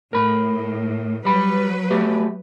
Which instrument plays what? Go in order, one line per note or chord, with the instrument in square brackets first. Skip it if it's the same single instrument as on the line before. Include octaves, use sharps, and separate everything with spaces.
[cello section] A2 [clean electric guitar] A#4 B5
[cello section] F#3 B4 [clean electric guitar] G3 B5
[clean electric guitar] A3 F#4 G4